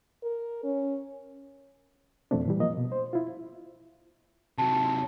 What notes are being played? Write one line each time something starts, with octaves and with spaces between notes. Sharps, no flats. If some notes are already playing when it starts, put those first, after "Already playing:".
A#4
C#4
F2 B2 F3 A3 C4 D4
A#2 E3 G3
F3 A#3 D#5
B2
C5
E4 F4
C3 F#3 A5